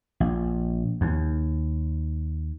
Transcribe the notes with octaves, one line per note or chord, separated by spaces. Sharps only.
A#1
D#2